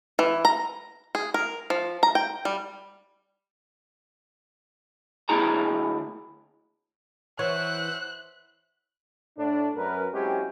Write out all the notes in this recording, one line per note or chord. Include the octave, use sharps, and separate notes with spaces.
E3
A#5
G#4
A#4
F3
A#5
G5
G3
D2 E4 G#4 A#5
E3 C5 C#5 E5 F#5 F#6
A2 D4
F#2 A#4 B4
F#3 G#3 C4 C#4 E4 G4